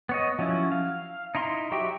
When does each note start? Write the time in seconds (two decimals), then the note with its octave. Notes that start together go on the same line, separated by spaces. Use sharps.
0.09 B3 C#5 D#5
0.39 F3 F#3 C#4 E4
0.72 F5
1.35 D#4 E4 A#5 C6
1.72 F#3 F#4 G4 E5 G5